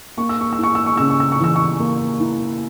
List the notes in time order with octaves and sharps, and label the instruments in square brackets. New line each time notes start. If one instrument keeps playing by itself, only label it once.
[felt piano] A#3 C#6
E6
C#6
E6
E4
C#6
E6
C#6
C#3 E6
C#6
E6
C#6
E3 E6
C#6
A#3
E4